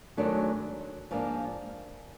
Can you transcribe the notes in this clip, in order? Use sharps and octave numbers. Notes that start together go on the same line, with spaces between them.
G#2 D#3 F#3 A3 D4
G#2 F3 A#3 D4